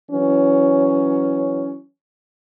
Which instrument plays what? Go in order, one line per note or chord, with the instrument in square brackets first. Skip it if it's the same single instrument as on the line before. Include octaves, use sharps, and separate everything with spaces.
[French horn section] E3 F#3 C#4